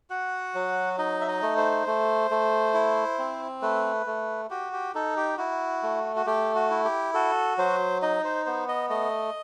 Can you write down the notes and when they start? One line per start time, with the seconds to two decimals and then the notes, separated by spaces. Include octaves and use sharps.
0.10 F#4 F#5
0.55 F#3
0.98 D#4 D#5
1.21 E5
1.28 D#5
1.42 A3
1.57 C5
1.87 A3
2.31 A3
2.74 E4
3.19 C4
3.62 A3 B4
4.06 A3
4.50 F#4 G4
4.73 G4
4.95 D#4 A4
5.17 G4
5.38 E4 F#4
5.83 A3
6.16 F#4
6.26 A3 G4
6.55 F#4
6.70 E4
6.84 G4
7.14 F#4 A4
7.58 F#3 C5
8.02 D#4 D#5
8.25 C5
8.46 B3 C5
8.68 D#5
8.89 A3 D#5